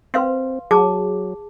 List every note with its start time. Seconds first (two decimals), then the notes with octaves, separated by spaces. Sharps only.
0.14 C4 B4 F5 C6
0.71 F#3 G#4 A5 D6